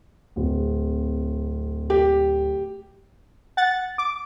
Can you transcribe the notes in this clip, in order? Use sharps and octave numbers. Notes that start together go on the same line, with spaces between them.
D1
G4
F#5 A6
D6